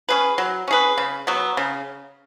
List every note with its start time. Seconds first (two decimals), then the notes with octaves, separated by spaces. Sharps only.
0.09 C#4 G#4 B4
0.38 F#3
0.68 C#4 G#4 B4
0.98 C#3
1.27 F#3 B3
1.57 C#3